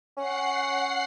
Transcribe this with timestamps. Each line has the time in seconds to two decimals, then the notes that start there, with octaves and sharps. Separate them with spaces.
0.17 C#4 F#5 C7